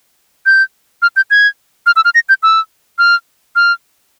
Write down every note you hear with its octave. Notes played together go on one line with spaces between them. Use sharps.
G6
F6
G6
G#6
F6
E6
F6
A#6
G6
E6
F6
F6